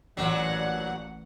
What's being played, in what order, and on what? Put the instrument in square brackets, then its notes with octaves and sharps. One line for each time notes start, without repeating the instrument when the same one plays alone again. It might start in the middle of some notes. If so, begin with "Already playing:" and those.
[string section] A1 F#5 [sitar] A#2 F#3